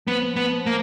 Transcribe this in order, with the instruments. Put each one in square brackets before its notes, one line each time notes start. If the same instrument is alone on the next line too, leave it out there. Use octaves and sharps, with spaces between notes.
[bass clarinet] F3 [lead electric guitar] B3
[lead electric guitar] B3
A#3